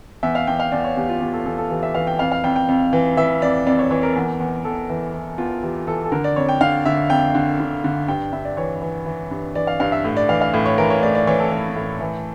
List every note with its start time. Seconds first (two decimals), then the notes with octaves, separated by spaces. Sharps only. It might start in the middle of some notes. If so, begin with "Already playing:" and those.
0.23 E2 E5
0.35 F5
0.47 E2 G5
0.60 F5
0.72 E2 D5
0.84 C#5
0.96 E2 G4
1.09 F4
1.21 E2 G4
1.33 A4
1.46 E2 A4
1.58 A4
1.70 E3 G4
1.83 E5
1.95 E3 F5
2.07 G5
2.19 F2 F5
2.32 F5
2.44 F2 G5
2.56 G5
2.68 F2
2.93 E3
3.17 E3 E5
3.42 F2 D5
3.66 F2 D5
3.79 C#5
3.91 E3 C#5
4.03 A#4
4.16 E2
4.40 E2
4.65 E2 A4
4.89 E3
5.14 E3
5.38 E2 F4
5.63 E3 G4
5.87 E3 A4
6.04 A4
6.12 D3 A#4
6.24 D5
6.36 F2 C#5
6.49 G5
6.61 D3 F5
6.85 D3 E5
7.10 F2 G5
7.35 D3
7.60 D3
7.84 D3
8.08 G2 G5
8.33 G2 E5
8.45 D5
8.57 E3 C#5
8.82 E3
9.06 E3
9.31 G2
9.55 E3 D5
9.67 F5
9.80 G2 F5
9.92 E5
10.04 A2
10.17 D5
10.29 E3 F5
10.41 F5
10.54 A2
10.66 C#5
10.78 E3 A#4
10.90 C#5
11.02 A2 D5
11.15 D5
11.27 E3 C#5
11.40 A4
11.52 E3
11.76 A2
12.01 E3